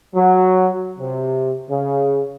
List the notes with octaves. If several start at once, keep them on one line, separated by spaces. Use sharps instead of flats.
F#3
C3
C#3